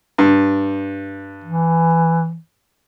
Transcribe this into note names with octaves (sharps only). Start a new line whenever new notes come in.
G2
E3